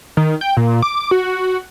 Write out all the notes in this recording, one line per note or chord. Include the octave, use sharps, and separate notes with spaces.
D#3
G5
A#2
D6
F#4